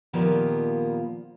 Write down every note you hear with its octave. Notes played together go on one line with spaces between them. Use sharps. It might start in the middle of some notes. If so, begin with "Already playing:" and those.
A#2 D#3 F3 G3 A#3 B3